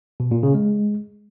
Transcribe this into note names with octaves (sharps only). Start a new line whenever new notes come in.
B2
A#2
C#3
G#3